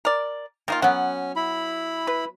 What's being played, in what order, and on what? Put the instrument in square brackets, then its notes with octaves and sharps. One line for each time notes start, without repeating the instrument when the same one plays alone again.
[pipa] A#4 D5
[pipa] D#3 A#3 F4 [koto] A#4
[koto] F#3 B3 [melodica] C#4 [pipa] F#5
[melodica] E4 B5
[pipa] B4